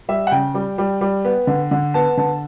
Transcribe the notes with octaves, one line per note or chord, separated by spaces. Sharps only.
G3 E5
F#5
C#3 G5
G3
G3
G3
B3
D3
D3
B3 A5
D3 A5